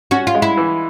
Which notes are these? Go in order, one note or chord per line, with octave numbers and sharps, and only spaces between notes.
C#4 F#4
F4
G#3
E4
E3